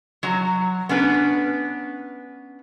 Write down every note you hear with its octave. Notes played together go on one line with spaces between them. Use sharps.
F#3 F#4 A#5
B3 C#4 D4 B4